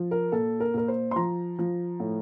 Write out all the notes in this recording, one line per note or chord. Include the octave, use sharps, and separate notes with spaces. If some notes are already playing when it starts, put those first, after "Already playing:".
Already playing: F3
A#4
A#2 A4
A#4
A#2 A#4
C5
C6
F3 A#5
F3
A2